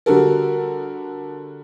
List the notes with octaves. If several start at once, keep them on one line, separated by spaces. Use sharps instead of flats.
D3 G3 F#4 A4 A#4